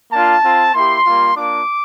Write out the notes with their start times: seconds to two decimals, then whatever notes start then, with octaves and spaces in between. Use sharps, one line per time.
0.12 A#3 D4 F4 A5
0.43 C4 F4
0.74 A#3 E4 G4 C6
1.05 G3 A#3 F4
1.35 A#3 D4 F4 D6